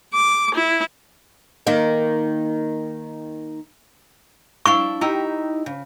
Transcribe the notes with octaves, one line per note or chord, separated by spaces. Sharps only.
D6
E4
D#3 A#3
D4 E4 F5 C#6
D#4 E4 G4
C#3